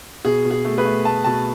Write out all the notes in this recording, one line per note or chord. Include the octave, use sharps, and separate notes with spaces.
B2 G#4
B2
G#4
A3
G#4 B4
A3
A3 A5
B2 A5